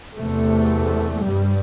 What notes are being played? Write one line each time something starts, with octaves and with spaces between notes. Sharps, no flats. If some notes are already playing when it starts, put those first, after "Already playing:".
E2 C3 A3
G2 G3